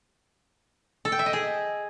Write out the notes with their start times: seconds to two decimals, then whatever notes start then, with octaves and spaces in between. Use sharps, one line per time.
1.05 A4
1.12 G5
1.19 E5
1.26 D#5
1.33 G#4